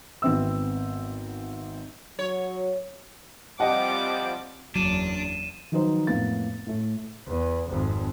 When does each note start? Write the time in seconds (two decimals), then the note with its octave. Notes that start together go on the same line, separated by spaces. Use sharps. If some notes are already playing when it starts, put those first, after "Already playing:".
0.22 G#1 B3 C4 E5 E6
2.19 F#3 C#5
3.60 F3 G3 C4 G4 D#5 F#5 D6
4.75 F#1 E2 F#3 D4 D#7 E7
5.72 D#3 F3 F#3 D#4 B4 C5
6.07 F2 A2 A#3 B3 A6
6.67 A2 A3
7.27 E2
7.68 G#1 F2